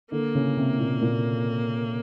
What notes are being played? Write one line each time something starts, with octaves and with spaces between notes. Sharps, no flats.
D3 A#3
C#3
C3
A#2
A#2